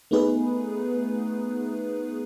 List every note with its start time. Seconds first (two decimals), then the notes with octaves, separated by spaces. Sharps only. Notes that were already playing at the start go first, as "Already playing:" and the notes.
0.11 A3 B3 D#4 G#4 B4